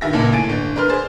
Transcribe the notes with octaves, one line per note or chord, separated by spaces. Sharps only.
G2 D#3 E5 A#6
C#2 A#2 A#3 A5
A2 G#5 A6 D7
G1
D4 A#4 B4 C6 F6
G#4 C5 A6